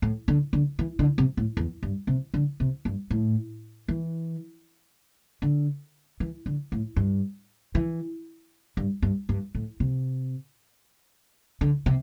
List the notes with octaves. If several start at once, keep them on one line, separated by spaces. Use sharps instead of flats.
A2
D3
D3
E3
D3
C3
A2
E2
G2
C3
D3
C3
G2
A2
E3
D3
E3
D3
A2
G2
E3
G2
G2
G2
A2
C3
D3
C3